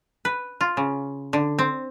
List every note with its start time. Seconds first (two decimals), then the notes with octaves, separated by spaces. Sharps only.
0.25 B4
0.61 F4
0.77 C#3
1.33 D3
1.59 C4